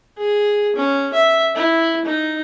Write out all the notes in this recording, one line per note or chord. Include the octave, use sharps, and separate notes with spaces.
G#4
C#4
E5
E4
D#4